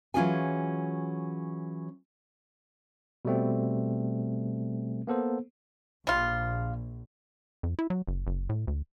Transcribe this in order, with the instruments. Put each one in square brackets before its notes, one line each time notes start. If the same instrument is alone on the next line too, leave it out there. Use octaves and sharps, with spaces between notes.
[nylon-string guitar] E3 F#3 C#4 F4 G#4 G#5
[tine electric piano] B2 G3 A3 C4
A#3 B3 A4 C5
[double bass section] A#1 [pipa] G3 F4
[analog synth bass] F2
E4
F#3
F#1
F#1
A2
D2